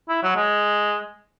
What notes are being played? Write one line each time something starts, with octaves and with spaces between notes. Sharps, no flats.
E4
F#3
G#3